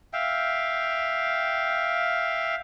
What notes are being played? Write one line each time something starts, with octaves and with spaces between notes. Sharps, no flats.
E5 F5 G5